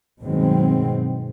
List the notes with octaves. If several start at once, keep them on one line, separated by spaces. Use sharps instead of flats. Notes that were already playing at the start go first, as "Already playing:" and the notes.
G2 B2 D#3 F#3 G#3 C4